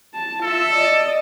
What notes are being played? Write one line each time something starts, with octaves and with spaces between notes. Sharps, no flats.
A5
F4 A4 E5
D5 D#5